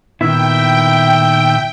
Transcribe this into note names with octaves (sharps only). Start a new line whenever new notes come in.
A#2 D#3 B3 E4 E5 G5